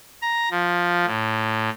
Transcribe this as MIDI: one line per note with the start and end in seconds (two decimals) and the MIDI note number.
0.22 0.49 82
0.50 1.05 53
1.06 1.70 45